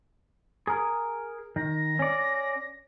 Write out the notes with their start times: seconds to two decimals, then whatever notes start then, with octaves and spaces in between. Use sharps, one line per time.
0.67 G#4 A#4
1.56 D#3 A#6
1.99 C#4 D5